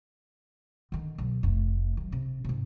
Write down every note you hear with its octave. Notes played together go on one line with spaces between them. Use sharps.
D3 D#3
B1
F1 A3
D#3 F#3
C3
G#2 C3